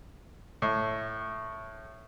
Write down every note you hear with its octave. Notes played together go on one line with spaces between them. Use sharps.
A2